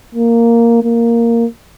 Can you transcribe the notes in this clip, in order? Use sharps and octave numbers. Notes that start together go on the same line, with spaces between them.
A#3
A#3